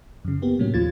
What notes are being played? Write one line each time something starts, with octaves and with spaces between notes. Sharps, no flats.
F#2 C#3
A#3 B3 G4
A2 C3 F#3 A#3 C#4
D#2 F3 F4 G#6 A6